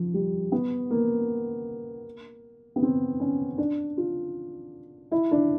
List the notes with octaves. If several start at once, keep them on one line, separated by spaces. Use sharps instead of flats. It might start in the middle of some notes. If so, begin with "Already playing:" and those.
Already playing: F3
G3
B3
A#3
B3
C4
C#4
D4
F4
E4
D4